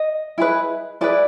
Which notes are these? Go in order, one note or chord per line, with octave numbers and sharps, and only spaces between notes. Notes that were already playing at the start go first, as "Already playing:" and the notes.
Already playing: D#5
E4 G#4 B4
E4 G#4 B4 D5